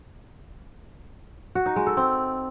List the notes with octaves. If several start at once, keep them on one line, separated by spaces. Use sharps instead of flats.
F#4
D#4
G#3
A4
C4